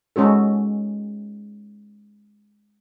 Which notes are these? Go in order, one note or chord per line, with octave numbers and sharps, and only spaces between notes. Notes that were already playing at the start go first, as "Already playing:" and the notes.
G#3 C#4 F#4 A4